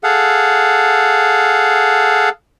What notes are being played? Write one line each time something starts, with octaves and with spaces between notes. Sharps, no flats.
G#4 A4 F5 F#5